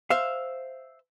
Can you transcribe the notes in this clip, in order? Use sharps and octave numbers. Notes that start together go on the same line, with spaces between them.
C5 E5 F5